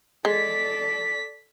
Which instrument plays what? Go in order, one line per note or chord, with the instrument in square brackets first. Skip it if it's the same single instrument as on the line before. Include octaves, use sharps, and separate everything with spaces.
[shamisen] G#3 [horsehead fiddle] A4 D5 [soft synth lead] B6